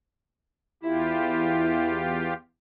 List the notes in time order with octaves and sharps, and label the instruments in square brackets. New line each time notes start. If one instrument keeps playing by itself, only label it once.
[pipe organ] E2 F4 G4 [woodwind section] E4